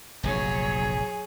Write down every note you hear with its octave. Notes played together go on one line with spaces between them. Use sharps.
F1 A#1 G2 F#3 G#4 C#5